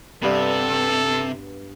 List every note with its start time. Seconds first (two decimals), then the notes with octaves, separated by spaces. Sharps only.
0.23 G2 C3 B3 A4